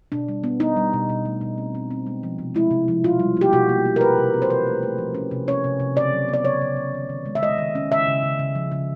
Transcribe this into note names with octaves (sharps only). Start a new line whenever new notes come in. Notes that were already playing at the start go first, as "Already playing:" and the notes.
B2 D4
G3
B3
B3 D#4
G3
B2
B2
A3
B2
C4
C4
C4
G#3
F3
C3
G#3 E4
C3
F3
B2 F4
G3
A#3 G4
B2 F#4
A#3
A#3
A#4
C3 B4
C3
C4
C5
E3 B4
A3
A3
F3
C#4
C3
C#4 C#5
C3
C3
C#3 D5
F#3
B3
D5
C#3 C#5
C#3
C#3
D#3
D#3
G#3
E5
G#3 D#5
D#3
C#4
C#3 E5
C#3
C#3
C#3
F3
C#3